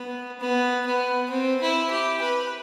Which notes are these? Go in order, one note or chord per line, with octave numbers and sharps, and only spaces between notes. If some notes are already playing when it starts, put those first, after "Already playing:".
Already playing: B3
B3
B3
C4
E4
G4
B4